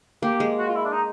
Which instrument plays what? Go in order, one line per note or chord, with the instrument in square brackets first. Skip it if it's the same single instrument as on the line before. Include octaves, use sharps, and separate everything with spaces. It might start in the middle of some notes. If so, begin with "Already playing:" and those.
[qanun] A#3 [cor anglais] G4
[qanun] G#3
[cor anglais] F#4
F4
E4
D4
D#4